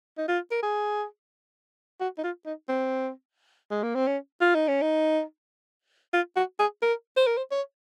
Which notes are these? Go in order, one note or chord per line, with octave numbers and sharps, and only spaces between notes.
D#4
F4
A#4
G#4
F#4
D#4
F4
D#4
C4
G#3
A#3
C4
C#4
F4
D#4
C#4
D#4
F4
F#4
G#4
A#4
C5
A#4
C5
C#5